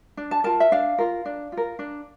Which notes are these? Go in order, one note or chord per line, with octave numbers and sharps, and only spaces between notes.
D4
A5
F4 A#4 A5
E5
D4 F5
F4 A#4
D4
F4
A#4
D4